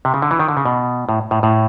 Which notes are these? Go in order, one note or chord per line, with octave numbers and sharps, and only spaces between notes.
C3
C#3
D3
E3
D#3
D3
C#3
B2
A2
A2
A2